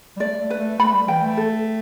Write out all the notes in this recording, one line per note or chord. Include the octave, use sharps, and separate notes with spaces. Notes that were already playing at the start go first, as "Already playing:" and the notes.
G3
A3 D5
A3
B4
A3
A3 B5
G3
E3 G5
A3
A4